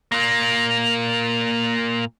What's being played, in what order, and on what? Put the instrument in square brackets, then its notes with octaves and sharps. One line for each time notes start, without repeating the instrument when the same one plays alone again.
[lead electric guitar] A#2 A#3